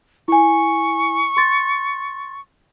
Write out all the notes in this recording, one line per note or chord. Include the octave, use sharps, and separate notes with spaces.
E4 G#5 C#6
C6 A6